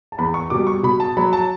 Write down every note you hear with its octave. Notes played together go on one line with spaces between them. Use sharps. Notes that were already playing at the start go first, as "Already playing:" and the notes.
A5
E2 B5
C#6
B2 G3 D6
C#6
B2 B5
A5
F#3 B5
A5